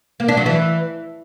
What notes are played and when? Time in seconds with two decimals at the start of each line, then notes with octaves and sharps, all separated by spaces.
0.20 A#3
0.28 D4
0.37 F#3
0.46 E3